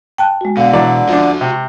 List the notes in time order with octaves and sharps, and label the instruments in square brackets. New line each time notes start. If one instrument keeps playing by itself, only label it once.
[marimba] G5 A5 F#6
G#3 F#4
[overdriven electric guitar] B2 [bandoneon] D3 [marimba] F5
[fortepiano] E3 F#3 D5
[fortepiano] F3 D4 [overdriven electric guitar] F#4 E5
[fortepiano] C3